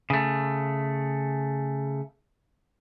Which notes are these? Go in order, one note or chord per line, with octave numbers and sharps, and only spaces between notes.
C#3 A3